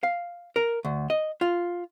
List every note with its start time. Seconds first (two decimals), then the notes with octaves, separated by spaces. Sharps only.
0.03 F5
0.56 A#4
0.85 D2
1.10 D#5
1.41 F4